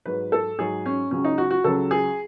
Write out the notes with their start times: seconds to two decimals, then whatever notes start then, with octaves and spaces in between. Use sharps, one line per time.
0.06 G#2 F#3 B4
0.32 A4
0.58 G#2 F#3 G#4
0.86 C#4
1.11 C#2 C#3 F#3 C#4
1.25 D#4
1.38 F#4
1.51 F#4
1.64 C#2 C#3 F#3 A4
1.91 G#4